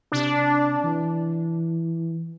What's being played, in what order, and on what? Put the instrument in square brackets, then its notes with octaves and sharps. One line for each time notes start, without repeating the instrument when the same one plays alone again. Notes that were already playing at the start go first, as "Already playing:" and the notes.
[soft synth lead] C3 [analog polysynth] D4
[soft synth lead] E3